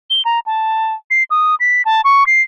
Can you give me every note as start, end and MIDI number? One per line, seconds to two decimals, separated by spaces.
0.10 0.22 103
0.25 0.40 82
0.46 0.94 81
1.10 1.23 96
1.31 1.55 87
1.60 1.82 95
1.85 2.01 81
2.04 2.26 85
2.27 2.42 96